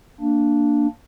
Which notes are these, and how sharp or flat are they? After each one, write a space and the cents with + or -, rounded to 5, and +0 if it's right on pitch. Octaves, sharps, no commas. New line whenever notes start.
A#3 -10 D4 +0